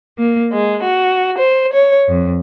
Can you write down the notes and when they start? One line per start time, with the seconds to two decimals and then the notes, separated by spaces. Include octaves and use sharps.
0.18 A#3
0.52 G#3
0.82 F#4
1.38 C5
1.72 C#5
2.08 F2